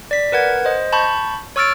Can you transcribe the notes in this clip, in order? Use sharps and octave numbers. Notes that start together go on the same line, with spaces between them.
D5 B6
A#4 B4 F#5 G#6
C5 D#5
A5 B5 C#6 G6
C#5 C#6 E6 F6 A6 D7